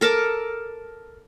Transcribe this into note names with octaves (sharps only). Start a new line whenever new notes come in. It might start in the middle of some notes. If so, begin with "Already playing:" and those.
A4 A#4 A5 D6